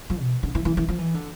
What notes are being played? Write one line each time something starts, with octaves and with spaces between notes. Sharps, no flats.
F3
B2
D3
E3
E3
E3
F3
E3
D3